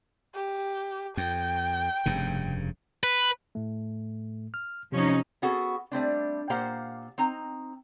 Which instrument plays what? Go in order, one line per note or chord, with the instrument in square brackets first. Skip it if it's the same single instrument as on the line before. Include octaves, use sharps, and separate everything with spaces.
[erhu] G4
[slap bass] F2 [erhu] G5
[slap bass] F1 G2 C#3
[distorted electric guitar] B4
[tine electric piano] A2 A3
F6
[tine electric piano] C3 [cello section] F3 C#4 D#4
[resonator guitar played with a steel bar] B3 C#4 F#4 G#4 A4
G3 A3 C4 D4
A#2 A#3 G4 C5 F5 F#5
C4 D#4 A#5